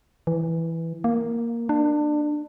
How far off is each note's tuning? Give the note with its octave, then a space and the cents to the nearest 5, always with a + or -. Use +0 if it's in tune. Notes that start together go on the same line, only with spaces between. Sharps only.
E3 +0
A#3 +0
D4 +25